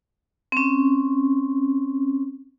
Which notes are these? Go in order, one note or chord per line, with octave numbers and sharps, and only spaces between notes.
C4 C#4